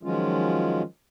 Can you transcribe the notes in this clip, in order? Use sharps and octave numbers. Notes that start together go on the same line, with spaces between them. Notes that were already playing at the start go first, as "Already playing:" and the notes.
D#3 F3 F#3 G#3 C#4 F4